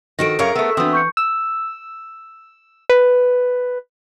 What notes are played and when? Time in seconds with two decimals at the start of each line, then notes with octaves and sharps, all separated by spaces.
0.19 D#3 F3 F#4 A4 A#6 D7
0.39 F#2 G#4 A#4 C#5 F5 A#5
0.55 A3 B3 E5
0.77 E3 B3 C4 D4 F#4 D#6
0.93 C#6 G6 C#7
1.17 E6
2.89 B4